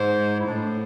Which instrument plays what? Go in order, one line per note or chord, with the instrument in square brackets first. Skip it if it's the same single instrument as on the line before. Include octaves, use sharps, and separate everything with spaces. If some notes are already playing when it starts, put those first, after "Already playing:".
Already playing: [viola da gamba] G#2 [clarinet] C5
[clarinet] E4
[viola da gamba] A2 [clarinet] D4